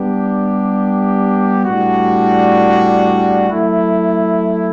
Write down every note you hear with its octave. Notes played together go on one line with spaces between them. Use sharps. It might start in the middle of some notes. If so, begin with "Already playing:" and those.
Already playing: G3 B3 D4 G4
A2 G3 D4 F#4
F#3 A3 E4